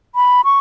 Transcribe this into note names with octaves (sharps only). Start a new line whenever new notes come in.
B5
C#6